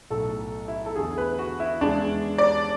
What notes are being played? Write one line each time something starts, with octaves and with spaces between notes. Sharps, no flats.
B1 A2 F#3 A3 A4
E4
A4
E2 D3 A3 G#4
B4
F#4
E4
E2 C#3 G#3 D4
D5